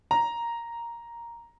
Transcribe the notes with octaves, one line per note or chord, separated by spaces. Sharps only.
A#5